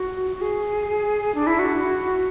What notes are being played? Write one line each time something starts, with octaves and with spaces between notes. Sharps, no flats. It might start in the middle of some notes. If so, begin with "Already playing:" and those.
Already playing: F#4
F#4
G#4
D4
E4
F#4